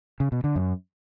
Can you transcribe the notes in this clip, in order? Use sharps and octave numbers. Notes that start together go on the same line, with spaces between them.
C#3
B2
D3
F#2